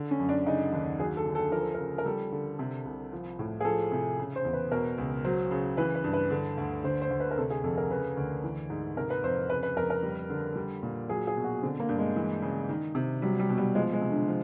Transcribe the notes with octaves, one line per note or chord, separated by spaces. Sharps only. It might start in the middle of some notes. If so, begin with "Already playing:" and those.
Already playing: D3
C#4
F#2
D4
C#3 D#4
D#2
F#3 G#4
A4
D3
A4
F3 A#4
A4
C#3 A#4
A#4
G3 A4
D3
C3
C2
F3
A2
G#4
F3 A4
C3
C#3
C5
E2
B4
B2 A#4
C#2
F#3 C5
C#3
E3 B4
B4
G2
B4
D3
D2
D3 C5
C5
D2
B4
A#4
C3 A4
G#4
F2 A4
A#4
C#3 B4
D2
E3
G#2
C3 A#4
B4
F2 C5
C#3 B4
B4
F2 A#4
A#4
G3
D3
G3
A#2
F#3 G#4
G#4
B2
F#4
D3 C4
A#3
G2
G#3
E3
C#3
D#3
C3
F#3 G3
G3
B2
G3
F3 G#3
G#3
C3
D3
F3